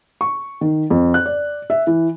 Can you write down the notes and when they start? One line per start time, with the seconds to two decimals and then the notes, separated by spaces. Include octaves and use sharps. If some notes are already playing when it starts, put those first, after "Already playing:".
0.21 C#6
0.61 D#3
0.90 F2
1.14 F#6
1.26 D5
1.70 E5
1.87 E3